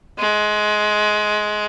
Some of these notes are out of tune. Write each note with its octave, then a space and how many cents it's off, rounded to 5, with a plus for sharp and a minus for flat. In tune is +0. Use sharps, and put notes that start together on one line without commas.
G#3 +20